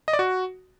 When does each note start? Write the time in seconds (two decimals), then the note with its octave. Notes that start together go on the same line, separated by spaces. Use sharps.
0.08 D#5
0.13 D5
0.19 F#4